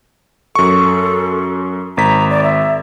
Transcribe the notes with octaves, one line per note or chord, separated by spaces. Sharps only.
F#2 A4 C#6
G#1 A#5 B6
D5
E5